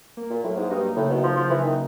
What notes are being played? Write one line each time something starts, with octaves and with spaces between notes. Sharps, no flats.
A#3
A#2
A2 F#3
G#2
G2 D#4
A2 C#3
B2
C#3 F3
F3
C#3 E3
D#3